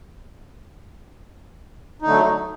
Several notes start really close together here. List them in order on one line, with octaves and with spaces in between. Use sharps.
D#4 D3 A3 F#3